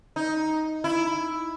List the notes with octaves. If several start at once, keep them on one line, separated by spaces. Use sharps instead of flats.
D#4
E4